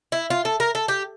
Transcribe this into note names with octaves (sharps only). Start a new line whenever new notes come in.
E4
F4
A4
A#4
A4
G4